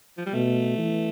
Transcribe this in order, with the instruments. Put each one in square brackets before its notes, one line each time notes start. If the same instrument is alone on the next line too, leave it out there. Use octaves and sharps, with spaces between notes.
[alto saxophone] F3
G3
[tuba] B2 [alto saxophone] A3
[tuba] E3